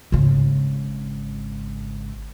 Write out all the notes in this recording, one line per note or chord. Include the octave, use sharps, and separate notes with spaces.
G#1 C#3